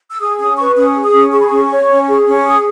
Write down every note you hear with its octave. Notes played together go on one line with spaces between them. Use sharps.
E6
G#4 D#6
C#4 D#6
B4 C#6
C#4 D#6
G#4
D#6
C#4
G#4 C#6
B5
C#4 C#6
C#5
C#4
G#4
C#4
G#4 D#6